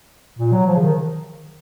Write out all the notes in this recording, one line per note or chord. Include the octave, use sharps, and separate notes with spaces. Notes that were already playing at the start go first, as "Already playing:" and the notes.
A#2
F#3
F3
C#3
D#3